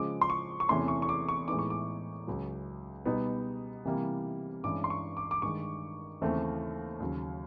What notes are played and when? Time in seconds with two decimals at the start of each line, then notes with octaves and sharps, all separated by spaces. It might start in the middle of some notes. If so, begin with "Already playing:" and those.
Already playing: C#3 F3 G#3 D6
0.21 C6
0.30 C#6
0.60 C#6
0.69 E2 C3 E3 A3 C#4 C6
0.88 C#6
1.02 C#6
1.09 D6
1.29 C#6
1.48 A2 E3 G#3 B3 D#4 D6
1.59 C#6
1.70 D6
2.27 C#2 C#3 F#3
3.05 B2 G3 B3 D#4
3.85 C3 E3 G3 A#3
4.64 G2 E3 G#3 C#4 D6
4.84 C6
4.90 C#6
5.17 D6
5.31 D6
5.42 G2 D#3 G#3 C#6
6.21 D#2 C#3 E3 A3 C4
7.00 D#2 C#3 F#3